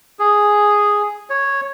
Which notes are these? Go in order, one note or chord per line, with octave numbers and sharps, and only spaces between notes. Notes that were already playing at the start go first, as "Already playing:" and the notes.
G#4
C#5